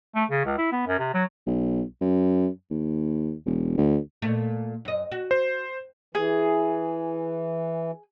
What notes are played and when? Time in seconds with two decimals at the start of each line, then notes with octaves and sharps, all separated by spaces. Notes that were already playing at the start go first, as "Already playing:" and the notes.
0.15 A3
0.30 C#3
0.45 C#2
0.58 E4
0.72 B3
0.87 F#2
1.00 C3
1.14 F#3
1.47 B1
2.01 F#2
2.71 D#2
3.46 E1
3.78 D2
4.22 A#2 A3
4.85 F#2 D#5
5.12 F#4
5.31 C5
6.15 E3 G#4